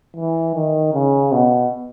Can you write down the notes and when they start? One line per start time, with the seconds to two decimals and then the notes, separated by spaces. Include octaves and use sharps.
0.17 E3
0.55 D#3
0.94 C#3
1.32 B2